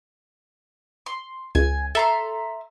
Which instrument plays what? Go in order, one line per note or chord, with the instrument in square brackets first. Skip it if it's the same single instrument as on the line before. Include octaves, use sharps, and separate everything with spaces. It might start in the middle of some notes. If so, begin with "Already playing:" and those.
[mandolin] C6
[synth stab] C#2 [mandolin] G#5
[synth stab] A4 [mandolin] E5 A#5 C6